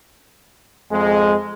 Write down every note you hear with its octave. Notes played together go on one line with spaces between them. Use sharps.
F2 G#3